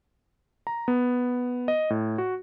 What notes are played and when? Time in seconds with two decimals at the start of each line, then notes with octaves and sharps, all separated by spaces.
0.67 A#5
0.88 B3
1.68 D#5
1.90 A2
2.18 F#4